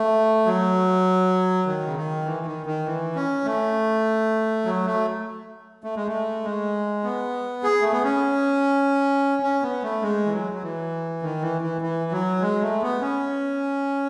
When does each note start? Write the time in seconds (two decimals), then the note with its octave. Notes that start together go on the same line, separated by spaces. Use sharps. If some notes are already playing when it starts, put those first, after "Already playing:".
Already playing: A3
0.46 F#3
1.66 D#3
1.85 C#3
1.97 D#3
2.26 E3
2.46 D#3
2.66 D#3
2.86 E3
3.15 C#4
3.45 A3
4.65 F#3
4.85 A3
5.84 A3
5.96 G#3
6.07 A3
6.44 G#3
7.04 B3
7.64 G#4
7.81 A3
7.92 B3
8.04 C#4
9.43 C#4
9.62 B3
9.83 A3
10.02 G#3
10.26 E3
10.32 F#3
10.53 F#3
10.63 E3
11.22 D#3
11.42 E3
11.61 E3
11.81 E3
12.12 F#3
12.42 G#3
12.61 A3
12.82 B3
13.01 C#4